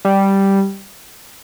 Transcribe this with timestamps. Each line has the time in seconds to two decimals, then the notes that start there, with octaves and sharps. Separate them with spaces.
0.05 G3